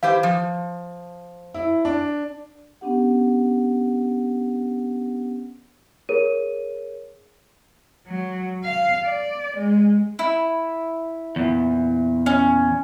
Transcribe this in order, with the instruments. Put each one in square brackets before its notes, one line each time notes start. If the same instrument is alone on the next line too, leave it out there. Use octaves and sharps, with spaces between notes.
[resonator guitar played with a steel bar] E3 G4 C5 [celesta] F5
[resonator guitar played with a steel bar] F3
[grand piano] E4
D4
[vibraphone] B3 C#4 D4 G4 F#5
[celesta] G#4 A#4 C#5 D#7
[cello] F#3
F5
D5
G#3
[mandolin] E4
[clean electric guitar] E2 A#2
[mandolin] C#4